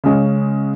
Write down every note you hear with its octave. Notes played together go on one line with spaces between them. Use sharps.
C#3 G#3 C#4